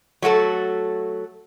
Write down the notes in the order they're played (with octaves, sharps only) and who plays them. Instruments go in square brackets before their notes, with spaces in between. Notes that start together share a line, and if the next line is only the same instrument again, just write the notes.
[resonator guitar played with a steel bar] F#3 A3 F#4 A4